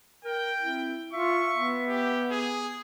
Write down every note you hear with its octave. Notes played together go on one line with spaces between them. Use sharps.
A#4 G5
C4 E4
F4 E5 C#6
B3
G4
G#4